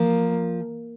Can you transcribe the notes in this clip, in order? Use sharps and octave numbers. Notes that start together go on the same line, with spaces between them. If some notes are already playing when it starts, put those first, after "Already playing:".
Already playing: F3 A#3